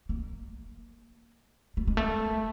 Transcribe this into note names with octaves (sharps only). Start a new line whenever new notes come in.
A#3
A3
G#3
A3